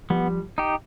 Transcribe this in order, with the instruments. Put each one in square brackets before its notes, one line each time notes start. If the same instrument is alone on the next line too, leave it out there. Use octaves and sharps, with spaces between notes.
[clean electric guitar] F3 G3 [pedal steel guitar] B3
[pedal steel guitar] D#4 G4